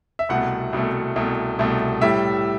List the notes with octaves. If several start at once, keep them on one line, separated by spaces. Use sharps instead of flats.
E5
C2 B2 A3 F#5
C2 B2 A3
C2 B2 A3
C2 B2 A3
A2 G3 E5